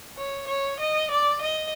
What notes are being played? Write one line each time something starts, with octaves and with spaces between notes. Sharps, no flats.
C#5
C#5
D#5
D5
D#5